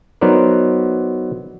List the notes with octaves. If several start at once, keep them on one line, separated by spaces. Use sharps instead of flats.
F#3 B3 D#4 A#4 C5 D5